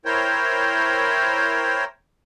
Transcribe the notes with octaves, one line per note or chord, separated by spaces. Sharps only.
E4 A#4 C5 C#5 G5